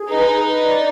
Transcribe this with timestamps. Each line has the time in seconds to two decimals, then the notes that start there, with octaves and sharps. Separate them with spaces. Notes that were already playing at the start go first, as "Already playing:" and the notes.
Already playing: G#4
0.09 D#4 B4
0.28 B4
0.46 B4
0.64 D5